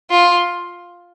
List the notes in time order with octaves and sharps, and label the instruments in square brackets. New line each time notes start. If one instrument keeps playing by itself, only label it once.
[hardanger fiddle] F4